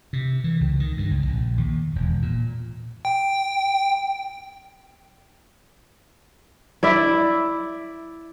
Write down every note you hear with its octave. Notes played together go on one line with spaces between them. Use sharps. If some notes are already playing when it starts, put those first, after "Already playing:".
C3
E3
C#2
D#3
G2
C#2
A#1
D#2
E1
A#2
G5
E4 D5 E5